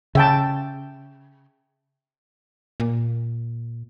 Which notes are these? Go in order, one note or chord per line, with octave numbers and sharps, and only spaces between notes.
C#3 E5 G5 A5
A#2